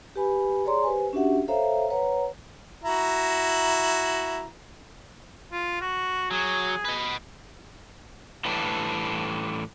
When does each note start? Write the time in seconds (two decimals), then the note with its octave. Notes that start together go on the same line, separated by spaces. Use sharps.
0.16 G4 B4 G#5 B5
0.65 G#4 C#5 D5 A#5 C6
0.83 G4 B4 C5 G#5
1.13 C#4 D4 F#4 G4 E5 F#5
1.48 A4 C5 C#5 E5 F5 A#5
1.90 B4 C#5 F#5 A#5
2.84 E4 F#4 A#5
5.52 F4
5.81 F#4
6.31 F#3 G#4
6.85 B4 D#5
8.45 A2 E3 G3 D4